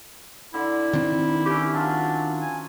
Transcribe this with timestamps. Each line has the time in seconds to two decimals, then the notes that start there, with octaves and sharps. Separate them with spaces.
0.54 D3 E4
0.93 D#3 C4
1.46 C#4 G4 E5 D6
1.74 F#3 D4 F4
2.42 G#5